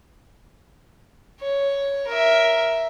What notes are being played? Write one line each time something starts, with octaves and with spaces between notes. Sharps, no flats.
C#5
A#4 E5